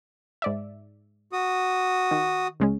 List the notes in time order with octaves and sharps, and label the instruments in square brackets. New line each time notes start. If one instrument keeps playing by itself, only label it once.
[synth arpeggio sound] G#2 D5 E5
[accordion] F#4 D#6
[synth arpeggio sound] D#3
C#2 G#3 C#4